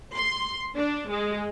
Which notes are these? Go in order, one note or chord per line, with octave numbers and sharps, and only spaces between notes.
C6
D4
G#3